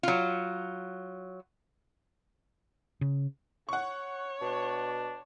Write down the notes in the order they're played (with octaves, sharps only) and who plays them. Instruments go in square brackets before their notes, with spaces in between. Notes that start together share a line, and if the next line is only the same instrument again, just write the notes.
[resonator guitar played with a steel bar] F#3 F4
[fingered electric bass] C#3
[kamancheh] C#5 [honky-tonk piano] F#5 C#6
[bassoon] B2 [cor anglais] D4